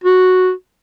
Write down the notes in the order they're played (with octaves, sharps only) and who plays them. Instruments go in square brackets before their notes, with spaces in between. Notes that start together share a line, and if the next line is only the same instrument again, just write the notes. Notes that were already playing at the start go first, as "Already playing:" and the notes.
[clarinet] F#4